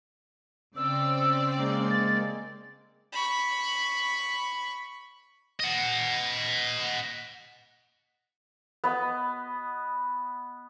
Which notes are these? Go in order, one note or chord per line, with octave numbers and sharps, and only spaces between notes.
C#3 C4 D5 E6
G#3 A#3
A6
B5 C#6
D#5 F#5
B3 D#5